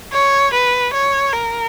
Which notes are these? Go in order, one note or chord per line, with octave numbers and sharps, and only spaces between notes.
C#5
B4
C#5
A#4